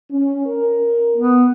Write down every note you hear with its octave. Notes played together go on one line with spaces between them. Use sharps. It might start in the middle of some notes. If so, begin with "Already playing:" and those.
C#4
A#4
B3